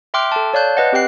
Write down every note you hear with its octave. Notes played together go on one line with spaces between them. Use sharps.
E5 G5 C6 D6 F6 F#6
A4 A5
C#5 D5 F5 A5 F#6 G6
B4 D#5 F#5
C4 G4 F#5 G5 F#6 C7